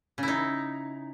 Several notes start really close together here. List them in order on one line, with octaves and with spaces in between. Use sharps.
C#3 E4 D#4